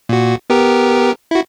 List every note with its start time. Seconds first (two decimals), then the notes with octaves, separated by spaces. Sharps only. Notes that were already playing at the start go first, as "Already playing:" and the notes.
0.09 A#2 F#4
0.50 B3 G4 A#4
1.31 E4 F#4